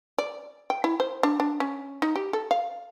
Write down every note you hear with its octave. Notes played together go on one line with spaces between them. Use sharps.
D5
G5
E4
C5
D4
D4
C#4
D#4
G4
A4
F5